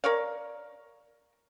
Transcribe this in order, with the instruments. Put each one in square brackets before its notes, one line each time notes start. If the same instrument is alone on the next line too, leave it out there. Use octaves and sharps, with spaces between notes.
[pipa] A#4 C#5 D5 F5